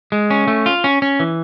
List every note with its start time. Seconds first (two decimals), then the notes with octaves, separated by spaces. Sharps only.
0.12 G#3
0.30 C#4
0.48 A3
0.66 F4
0.84 C#4
1.02 C#4
1.20 E3